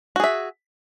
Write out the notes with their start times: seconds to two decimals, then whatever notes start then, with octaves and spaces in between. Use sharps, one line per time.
0.16 F#4
0.20 G#4
0.24 E5